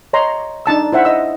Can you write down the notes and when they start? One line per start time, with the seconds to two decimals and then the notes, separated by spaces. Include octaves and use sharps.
0.13 C#5 D#5 A#5 C6
0.66 D4 D#4 A5 E6
0.92 E4 C5 E5 F#5
1.05 D#5 E6